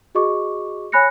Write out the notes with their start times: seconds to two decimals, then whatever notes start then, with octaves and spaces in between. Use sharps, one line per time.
0.15 F#4 G#4 D#5 C#6 D6
0.92 C#5 G#5 B5 F#6 A#6 C#7